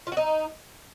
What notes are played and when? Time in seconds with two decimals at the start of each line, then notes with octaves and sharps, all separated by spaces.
0.07 F4
0.12 F#4
0.17 D#4